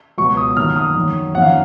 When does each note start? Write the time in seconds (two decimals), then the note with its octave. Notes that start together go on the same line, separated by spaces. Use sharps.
0.18 C#2 B2 F#3 B3 C#6
0.37 D#6
0.56 F#2 D#3 F#3 A#3 F6
0.76 D#6
0.96 F#2 D#3 F#3
1.34 F2 D#3 A#3 C#4 F#5
1.42 F5